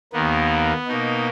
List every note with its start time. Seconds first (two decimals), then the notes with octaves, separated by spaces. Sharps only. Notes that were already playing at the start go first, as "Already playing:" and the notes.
0.13 D#2 D#3 A#3 B3
0.88 B2 A#3 D#4